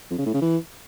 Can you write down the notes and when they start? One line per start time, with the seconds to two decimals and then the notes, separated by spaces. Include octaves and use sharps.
0.11 F2
0.18 C#3
0.26 A2
0.34 C#3
0.41 E3